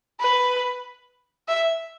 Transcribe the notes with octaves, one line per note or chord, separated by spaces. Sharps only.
B4
E5